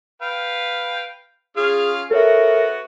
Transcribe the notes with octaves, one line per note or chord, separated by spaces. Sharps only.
B4 F5 G5
C#4 F4 G#4 F6
B3 F#4 A4 A#4 C#5 E5